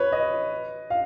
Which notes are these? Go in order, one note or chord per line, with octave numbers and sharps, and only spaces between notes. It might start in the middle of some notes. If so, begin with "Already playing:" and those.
Already playing: B4 C#5
D#5
F5